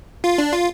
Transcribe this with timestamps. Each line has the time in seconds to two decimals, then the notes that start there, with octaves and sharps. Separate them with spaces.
0.24 F4
0.38 D4
0.53 F4